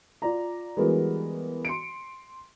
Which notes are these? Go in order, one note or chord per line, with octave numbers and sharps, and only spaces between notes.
F4 D5 A#5
E3 G3 G#3 B3 F#4 A#4
C6 C#7 D7